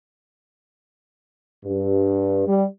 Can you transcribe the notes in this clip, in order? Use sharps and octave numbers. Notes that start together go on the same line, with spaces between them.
G2
G3